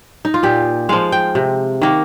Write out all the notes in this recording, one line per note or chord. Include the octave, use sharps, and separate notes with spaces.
D#4
F4
A#2 G4
F3 G#3 F5
G5
C3
D#3 A#3